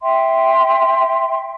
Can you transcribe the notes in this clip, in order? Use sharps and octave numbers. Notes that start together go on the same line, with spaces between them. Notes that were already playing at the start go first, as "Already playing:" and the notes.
E5 G5 C6